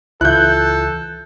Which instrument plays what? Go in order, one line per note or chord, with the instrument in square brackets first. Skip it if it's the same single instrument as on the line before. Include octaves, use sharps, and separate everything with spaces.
[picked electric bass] C#2 E3 [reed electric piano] E4 F4 [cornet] A4 [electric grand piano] F#6 G6